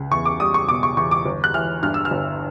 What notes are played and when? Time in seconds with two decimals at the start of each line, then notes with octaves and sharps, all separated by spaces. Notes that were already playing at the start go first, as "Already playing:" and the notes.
Already playing: C#2
0.11 E2 C#6
0.25 D6
0.40 G3 D#6
0.54 C#6
0.68 B2 D6
0.83 C#6
0.97 E2 C#6
1.11 D6
1.26 G1
1.44 F#6
1.54 E3 F6
1.83 G2 F6
1.94 E6
2.05 F6
2.11 G1